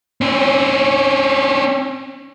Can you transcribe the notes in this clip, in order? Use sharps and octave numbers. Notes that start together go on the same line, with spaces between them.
C4 C#4